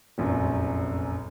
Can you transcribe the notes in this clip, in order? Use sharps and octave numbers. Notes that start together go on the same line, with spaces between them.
F1 A#1 F#2